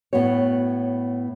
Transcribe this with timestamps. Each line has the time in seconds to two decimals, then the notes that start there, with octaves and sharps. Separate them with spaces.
0.13 A2 B3 F#4 C#5